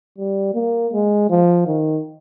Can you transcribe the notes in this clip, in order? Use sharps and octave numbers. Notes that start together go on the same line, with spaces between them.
G3
A#3
G#3
F3
D#3